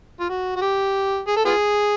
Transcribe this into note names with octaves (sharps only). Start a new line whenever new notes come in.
F4
F#4
F#4
G4
G#4
A4
B3 F4 G#4